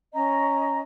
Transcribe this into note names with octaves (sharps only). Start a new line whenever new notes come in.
C#4 D#5 A#5